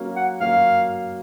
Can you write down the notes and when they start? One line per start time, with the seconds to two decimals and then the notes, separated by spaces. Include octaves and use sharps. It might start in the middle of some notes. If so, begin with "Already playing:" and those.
Already playing: F#3 A#3 C#4 F#4 A#4
0.16 F#5
0.40 F#3 A#3 C#4 F#4 A#4 F5